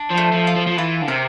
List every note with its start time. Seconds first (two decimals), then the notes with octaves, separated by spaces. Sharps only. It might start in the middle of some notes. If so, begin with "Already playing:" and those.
Already playing: D4
0.11 F3
0.17 A3
0.32 F3
0.47 F4
0.56 F3
0.67 F3
0.77 E3 F4
1.02 D3
1.08 C3 A#4